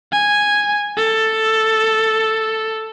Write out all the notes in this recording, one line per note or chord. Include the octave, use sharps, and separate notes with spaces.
G#5
A4